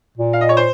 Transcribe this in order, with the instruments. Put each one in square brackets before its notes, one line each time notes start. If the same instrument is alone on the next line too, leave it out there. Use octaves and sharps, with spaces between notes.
[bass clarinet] A#2
[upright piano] F5
D#5
C#5
C5